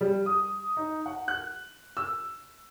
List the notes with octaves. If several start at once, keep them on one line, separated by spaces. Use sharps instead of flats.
G3
D#6
D#4
F#5
F#6
E6